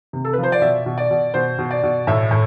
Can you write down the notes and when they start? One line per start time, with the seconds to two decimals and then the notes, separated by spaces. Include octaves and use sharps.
0.13 C3
0.25 A4
0.33 B4
0.38 F3
0.43 C5
0.52 D5
0.62 B2 E5
0.86 B2
0.98 D5
1.11 B2
1.34 B2 C5
1.58 B2
1.71 D5
1.83 B2
2.07 A2 E5
2.31 A2